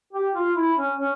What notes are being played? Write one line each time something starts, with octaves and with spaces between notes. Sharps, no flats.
G4
F4
E4
C#4
C#4